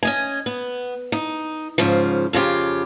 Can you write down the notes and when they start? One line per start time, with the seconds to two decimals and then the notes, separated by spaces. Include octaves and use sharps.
0.03 C#4 D#5 G#5
0.46 B3
1.12 D#4
1.78 G#2 C#3 F3
2.33 F2 C#3 F4 G4